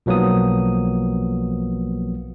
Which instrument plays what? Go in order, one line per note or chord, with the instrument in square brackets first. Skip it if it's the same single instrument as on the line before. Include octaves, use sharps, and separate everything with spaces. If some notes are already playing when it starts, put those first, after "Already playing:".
[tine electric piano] B1 F3 F#3 A#3 B3 D#6